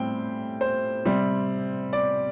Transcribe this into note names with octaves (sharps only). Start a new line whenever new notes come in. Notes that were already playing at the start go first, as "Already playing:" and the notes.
Already playing: A2 G3 C4 G5
C5
C3 G3 C4
D5